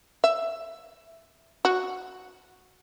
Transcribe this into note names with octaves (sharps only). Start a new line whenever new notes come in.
E5
F#4